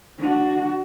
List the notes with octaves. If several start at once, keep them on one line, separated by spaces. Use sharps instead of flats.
D4 F#4